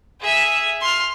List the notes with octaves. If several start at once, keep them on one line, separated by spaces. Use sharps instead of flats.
G#4 E5
C6 F6